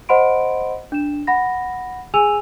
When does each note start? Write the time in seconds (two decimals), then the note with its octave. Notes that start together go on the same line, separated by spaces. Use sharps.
0.09 C5 D#5 F#5 B5 C6 D7
0.92 D4 E7
1.27 F#5 B5 A#6
2.14 G#4 G#5 E6 D#7 F7